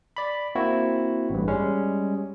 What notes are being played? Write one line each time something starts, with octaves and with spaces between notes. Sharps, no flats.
D5 B5
A#3 C4 E4 F#4
A1 G2
G3 G#3 C#4